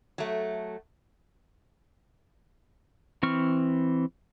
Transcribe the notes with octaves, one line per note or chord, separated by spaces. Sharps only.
F#3 A3
E3 C4 C#6 F6